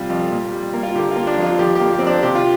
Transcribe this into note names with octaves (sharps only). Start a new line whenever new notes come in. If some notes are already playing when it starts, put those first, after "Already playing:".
Already playing: C3 G3 F4
F2
A#2
G3
A#3
F4
D3 G4
A#3 F4
D4
F2
F4
F3 G4
A#3 G4
G4
F2 C4
D4
C3 G4
F4